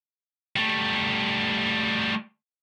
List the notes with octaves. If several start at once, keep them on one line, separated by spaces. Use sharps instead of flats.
G3 A3